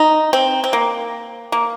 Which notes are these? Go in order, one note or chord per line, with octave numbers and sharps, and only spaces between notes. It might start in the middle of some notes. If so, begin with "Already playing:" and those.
Already playing: D#4
C4
C4
A#3
A#3